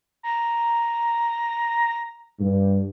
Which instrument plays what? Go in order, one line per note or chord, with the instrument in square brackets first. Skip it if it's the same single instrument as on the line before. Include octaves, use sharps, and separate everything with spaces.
[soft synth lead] A#5
[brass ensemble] G2